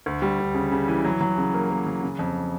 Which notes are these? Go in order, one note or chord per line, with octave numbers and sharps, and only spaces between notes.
D2
G3
D2
C#3
C#3
E3
F#3
F#3
C#3
A#3
A#3
F#3
C#3
F2